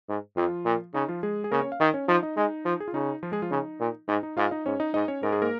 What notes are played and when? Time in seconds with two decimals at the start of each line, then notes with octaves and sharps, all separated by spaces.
0.09 G#2
0.37 F2 F3 F4
0.65 A#2
0.94 C#3 D#4
1.08 F3 F4
1.23 G#3 G#4
1.44 G#4
1.51 C#3 A#3 A#4
1.61 C#4 C#5
1.72 F5
1.80 D#3 D#4 D#5
1.94 C#4 C#5
2.08 F3 D#4 D#5
2.23 D#4 D#5
2.37 G#3 D#4
2.65 F3
2.80 G#4
2.88 F4
2.94 C#3 D#4
3.23 F3 F4
3.32 G#3 G#4
3.42 F3 F4
3.51 C#3 D#4
3.80 A#2
4.08 G#2 D#4
4.23 D#4
4.37 G#2 F4 F5
4.51 D#4 D#5
4.66 G#2 C#4 C#5
4.80 D#4 D#5
4.94 G#2 D#4 D#5
5.08 C#4 C#5
5.22 G#2 A#4
5.33 G#4
5.42 A#3 A#4